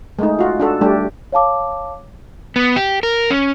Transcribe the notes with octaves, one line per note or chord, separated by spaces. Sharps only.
G#3 A3 D#4
F4 F#4
D4 F#4 A4
G3 A3 D4 G4
C#5 F5 A5 D6
B3
G4
A#4
C#4